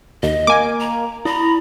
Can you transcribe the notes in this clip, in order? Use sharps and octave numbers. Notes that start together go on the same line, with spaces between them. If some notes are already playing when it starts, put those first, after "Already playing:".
D#2 D#5
A#3 G#5 D6
A#5
E4 A#5 B5